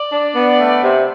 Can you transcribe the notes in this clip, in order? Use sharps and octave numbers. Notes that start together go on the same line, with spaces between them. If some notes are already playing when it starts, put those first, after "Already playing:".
Already playing: D5
D4
B3
A3
C3